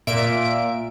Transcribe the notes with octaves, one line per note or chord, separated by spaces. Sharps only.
A#2 E5 D7